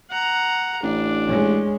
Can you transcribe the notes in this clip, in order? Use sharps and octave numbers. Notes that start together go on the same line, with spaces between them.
F#5 A#5
A1 D4
G#3 C#4